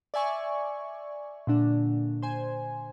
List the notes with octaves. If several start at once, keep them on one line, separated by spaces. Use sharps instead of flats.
D5 E5 G#5 C#6
A#2 D3 D4
C5 G#5